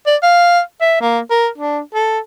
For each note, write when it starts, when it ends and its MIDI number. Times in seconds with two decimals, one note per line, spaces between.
0.06 0.16 74
0.23 0.60 77
0.81 0.98 76
1.01 1.19 58
1.30 1.48 70
1.58 1.80 62
1.94 2.19 69